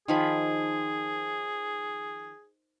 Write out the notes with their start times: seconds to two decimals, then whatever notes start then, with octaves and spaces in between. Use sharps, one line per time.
0.08 D#3 F3 G#4 B5